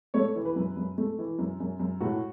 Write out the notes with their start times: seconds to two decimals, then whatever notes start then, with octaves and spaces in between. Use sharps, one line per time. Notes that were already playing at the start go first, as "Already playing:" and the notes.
0.14 A3 C#5
0.36 E3
0.45 B4
0.56 F#2
0.77 F#2
0.98 A3
1.19 E3
1.39 F#2
1.60 F#2
1.80 F#2
2.00 A2 F#4